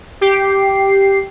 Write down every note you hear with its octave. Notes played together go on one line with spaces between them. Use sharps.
G4 C7